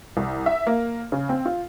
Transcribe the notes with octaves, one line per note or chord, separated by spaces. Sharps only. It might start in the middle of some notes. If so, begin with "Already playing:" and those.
C2
E5
A#3
C#3
C4
F4